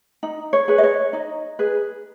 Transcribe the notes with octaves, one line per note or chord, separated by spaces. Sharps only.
D#4
C#5
G#4 B4
D#5
C#5
D#4 D#5
G#4 B4